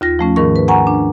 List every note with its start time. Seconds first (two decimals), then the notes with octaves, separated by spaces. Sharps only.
0.01 D#2 F4 A#6
0.19 F3 A3 C#4
0.36 G#2 D#3 A#4 C#6
0.56 B4
0.68 F#5 G#5 A#5 C#6
0.87 D4